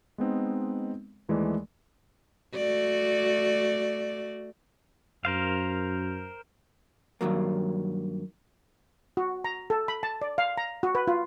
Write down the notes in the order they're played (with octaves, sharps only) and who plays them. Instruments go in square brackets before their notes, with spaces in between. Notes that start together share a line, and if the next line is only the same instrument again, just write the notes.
[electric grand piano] G#3 B3 C4 D#4
D#2 E3 G#3 A3 D5
[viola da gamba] A3 F#4 D5
[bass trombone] F#2 [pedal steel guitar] A#4 C5 F5
[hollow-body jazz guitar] G2 D#3 F#3 A#3
[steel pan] F#4
A#5
A4
B5
A5
D5
F5
A#5
F#4
B4
F4